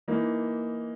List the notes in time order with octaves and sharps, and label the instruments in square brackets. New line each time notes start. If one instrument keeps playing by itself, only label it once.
[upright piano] E3 A#3 D#4